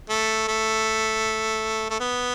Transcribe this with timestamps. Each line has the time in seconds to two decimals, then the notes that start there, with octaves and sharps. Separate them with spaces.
0.09 A3
0.48 A3
1.90 A3
2.00 B3